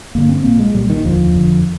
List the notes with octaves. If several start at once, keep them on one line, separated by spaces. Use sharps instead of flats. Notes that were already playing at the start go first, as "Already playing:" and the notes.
G1 G2 D3 A#3
C4
A#1 A#2 A#3
G#3
C2 A#2 G3
D#3
F1 D#2 D3 F3
F1 F2 D3